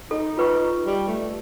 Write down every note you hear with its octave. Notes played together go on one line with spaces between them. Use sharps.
D#4 A4
F4 B4 C#6
G3
A3